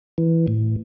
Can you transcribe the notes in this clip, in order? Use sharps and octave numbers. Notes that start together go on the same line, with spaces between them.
E3
A2